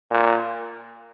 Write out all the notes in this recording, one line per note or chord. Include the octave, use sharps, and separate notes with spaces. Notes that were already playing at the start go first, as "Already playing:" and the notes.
A#2